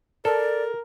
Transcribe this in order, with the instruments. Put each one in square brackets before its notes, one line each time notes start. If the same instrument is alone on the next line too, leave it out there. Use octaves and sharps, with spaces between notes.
[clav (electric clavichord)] A4 [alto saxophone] A#4 [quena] D5